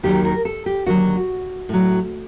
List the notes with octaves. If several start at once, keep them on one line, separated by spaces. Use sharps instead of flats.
D#2 D#3 F#3 G4
A#4
A4
G4
D#2 D3 F#3 F#4
A2 F#3